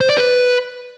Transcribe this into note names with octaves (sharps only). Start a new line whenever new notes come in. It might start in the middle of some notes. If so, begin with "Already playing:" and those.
C5
D5
B4